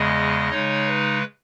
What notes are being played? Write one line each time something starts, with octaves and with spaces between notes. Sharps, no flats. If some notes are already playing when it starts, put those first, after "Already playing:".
Already playing: E2 C#3 G#3 D#5
C#3 G#3 D#4 C#5
B4